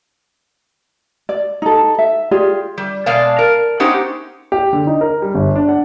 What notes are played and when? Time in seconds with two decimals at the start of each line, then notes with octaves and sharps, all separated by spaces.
1.29 D5
1.62 D#4 A4
1.99 E5
2.31 F4 G4 G#4 D5
2.78 G3
3.06 B2 G#3 D5 F5 A5
3.39 A#4
3.80 B3 C#4 D#4 G4 C5 F#5
4.52 G4
4.73 D3
4.87 D#4
5.01 A#4
5.22 G3
5.35 G1
5.55 D4
5.69 F#5